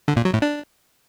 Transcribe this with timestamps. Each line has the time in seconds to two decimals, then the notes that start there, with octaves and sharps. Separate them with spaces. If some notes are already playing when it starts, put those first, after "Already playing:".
0.08 D3
0.16 A#2
0.25 F#3
0.34 A2
0.42 D4